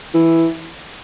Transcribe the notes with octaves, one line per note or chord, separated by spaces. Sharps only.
E3